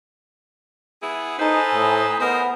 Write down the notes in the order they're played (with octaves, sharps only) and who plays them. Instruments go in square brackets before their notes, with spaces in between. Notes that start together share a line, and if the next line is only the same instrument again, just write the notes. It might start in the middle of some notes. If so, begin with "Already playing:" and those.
[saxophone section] B3 E4 G#4
[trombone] D#4 [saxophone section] A4 B4 C5 [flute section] G#5 A#5 D#6
[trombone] A2
[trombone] B3 [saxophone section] A#4 C5 D#5